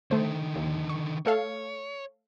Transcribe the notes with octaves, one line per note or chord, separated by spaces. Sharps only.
D3 D#3 A3 C5
D#2
C#6
A3 A4 C#5 F5